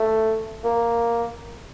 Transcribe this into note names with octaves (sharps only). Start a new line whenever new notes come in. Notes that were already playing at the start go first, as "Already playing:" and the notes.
Already playing: A3
A#3